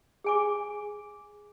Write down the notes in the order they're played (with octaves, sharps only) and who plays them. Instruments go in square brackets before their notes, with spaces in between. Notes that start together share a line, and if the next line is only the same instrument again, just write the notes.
[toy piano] G#4 G#5 D6